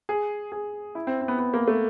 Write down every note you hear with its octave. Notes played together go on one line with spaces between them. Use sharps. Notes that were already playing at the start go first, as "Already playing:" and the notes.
G#4
G#4
E4
C4
C4
B3
B3
A#3
A3